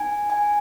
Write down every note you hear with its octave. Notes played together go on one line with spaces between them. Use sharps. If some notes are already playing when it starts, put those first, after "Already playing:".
Already playing: B3 D#4 F#4 G#5
G#5